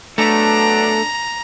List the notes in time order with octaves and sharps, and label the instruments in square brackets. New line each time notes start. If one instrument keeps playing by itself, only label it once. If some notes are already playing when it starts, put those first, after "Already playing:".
[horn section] F#3 B3 D4 [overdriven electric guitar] A3 [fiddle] A#5